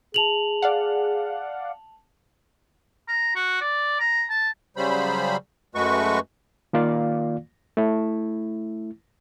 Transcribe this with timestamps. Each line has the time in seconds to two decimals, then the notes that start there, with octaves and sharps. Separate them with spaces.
0.14 G#4 A5 F7 F#7
0.62 D5 F5 F#5
3.08 A#5
3.35 F#4
3.61 D5
4.00 A#5
4.29 A5
4.77 C#3 F#3 G3 C5 B5
5.75 F#2 G#3 A3 F#4 B4 C#6
6.73 D#3 A#3 F4 D5 F5
7.77 A3 E4